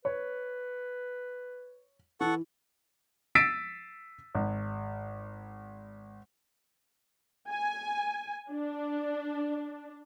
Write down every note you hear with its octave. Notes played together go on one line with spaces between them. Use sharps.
B4 C#5
E3 A4 F#5 C#6
E6 A6 B6 C7 D7 D#7
G#1
G#5
D4